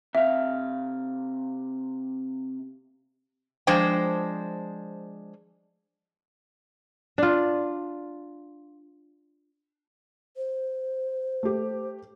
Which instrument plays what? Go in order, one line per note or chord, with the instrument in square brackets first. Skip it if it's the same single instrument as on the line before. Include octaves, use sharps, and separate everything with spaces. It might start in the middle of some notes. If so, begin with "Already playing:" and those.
[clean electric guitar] C3 F5 [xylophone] E5
[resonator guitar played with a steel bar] F3 G#3 D4 C5 G5
[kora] D4 F4
[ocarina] C5
[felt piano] A3 G4